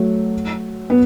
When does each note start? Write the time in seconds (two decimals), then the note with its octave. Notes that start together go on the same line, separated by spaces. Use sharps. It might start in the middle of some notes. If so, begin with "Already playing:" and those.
Already playing: F#3 A3
0.90 B3